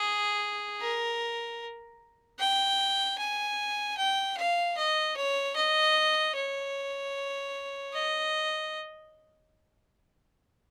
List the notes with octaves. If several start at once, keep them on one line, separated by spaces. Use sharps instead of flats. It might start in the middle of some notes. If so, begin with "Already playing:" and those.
Already playing: G#4
A#4
G5
G#5
G5
F5
D#5
C#5
D#5
C#5
D#5